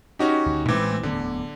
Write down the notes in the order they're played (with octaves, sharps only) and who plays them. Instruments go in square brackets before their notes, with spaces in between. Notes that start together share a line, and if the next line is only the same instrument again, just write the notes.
[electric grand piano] C#4 F#4 G4 [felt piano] D#4
[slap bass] D2
[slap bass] A1 A2 G#3 [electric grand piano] E3 C4 [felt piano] D6
[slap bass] D1 E2 A2 [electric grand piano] D3